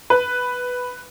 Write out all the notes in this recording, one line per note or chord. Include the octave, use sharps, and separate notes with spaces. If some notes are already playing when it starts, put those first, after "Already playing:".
B4